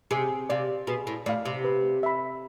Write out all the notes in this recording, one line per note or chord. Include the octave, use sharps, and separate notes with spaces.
C3 G#4
C3 D5 F5
B2 G#4
A2
A2 D5 F5
C3
B4
E5 B5